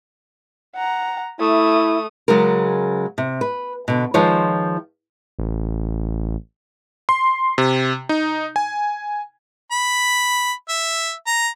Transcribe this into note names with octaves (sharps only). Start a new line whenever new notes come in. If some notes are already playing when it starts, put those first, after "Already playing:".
F#5 A#5
A3 E4 D#6
C#3 F#3 G#3 A#4
C3
B4
B2 D3
D#3 F3 G#3 F4 B4 C#5
A1
C6
C3
D#4
G#5
B5
E5
A#5